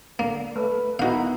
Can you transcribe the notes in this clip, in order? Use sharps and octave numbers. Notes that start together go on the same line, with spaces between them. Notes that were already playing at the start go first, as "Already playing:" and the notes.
D3 A#3
A3 B4
D#3 B3 D#4 E4 F#4 F5